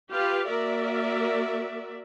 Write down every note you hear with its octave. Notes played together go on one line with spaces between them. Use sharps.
F4 G4 B4 F5
A#3 F#4 A#4 D5 E5